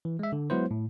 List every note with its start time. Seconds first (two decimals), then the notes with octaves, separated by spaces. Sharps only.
0.05 E3
0.19 G#3 E5
0.32 D3
0.50 F#3 G#3 B3 E4 B4 C5
0.71 A2